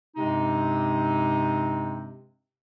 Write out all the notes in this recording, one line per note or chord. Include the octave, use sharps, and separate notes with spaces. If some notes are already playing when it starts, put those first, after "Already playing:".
G2 C3 G#3 C4 D#4